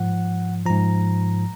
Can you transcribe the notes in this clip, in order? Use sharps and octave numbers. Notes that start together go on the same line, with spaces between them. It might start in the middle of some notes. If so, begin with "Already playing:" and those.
Already playing: G#2 F3 F#5
G#2 F3 A#5